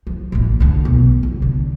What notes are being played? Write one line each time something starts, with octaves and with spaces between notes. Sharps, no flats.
F3
A1 A#3
D2 D3
B1
F1
D3